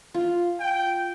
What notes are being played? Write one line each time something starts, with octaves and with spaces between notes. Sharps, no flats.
F4
G5